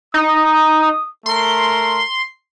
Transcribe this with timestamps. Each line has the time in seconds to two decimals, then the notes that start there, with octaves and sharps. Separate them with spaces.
0.14 D#4 D#6
1.26 A3 A#4 C6